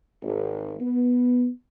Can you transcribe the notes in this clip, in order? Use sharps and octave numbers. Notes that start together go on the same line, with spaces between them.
G#1
B3